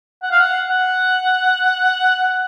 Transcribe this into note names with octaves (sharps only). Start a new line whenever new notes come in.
F#5
F5
F#5
F#5